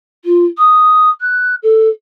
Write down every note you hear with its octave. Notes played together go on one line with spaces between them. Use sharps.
F4
D#6
F#6
A4